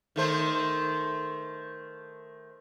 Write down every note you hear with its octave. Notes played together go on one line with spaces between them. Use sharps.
D#3 A3 C5